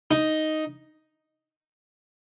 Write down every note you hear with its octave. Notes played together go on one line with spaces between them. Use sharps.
D#4